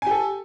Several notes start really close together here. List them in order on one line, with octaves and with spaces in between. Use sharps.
G#5 G4 A4